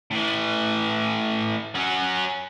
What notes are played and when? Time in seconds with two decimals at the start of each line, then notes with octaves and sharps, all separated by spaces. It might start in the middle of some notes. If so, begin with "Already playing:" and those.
0.11 A2 E3
1.75 F#3 C#4